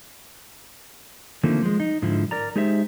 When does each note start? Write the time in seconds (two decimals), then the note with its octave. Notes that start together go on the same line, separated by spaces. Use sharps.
1.43 D3 D#3 F3 A3 A#3 C4
1.62 F3 G#3
1.80 D#4
2.02 G#2 D3 F3 E4
2.31 A#4 D5 A#5
2.56 G#3 D#4 G4 C5 E5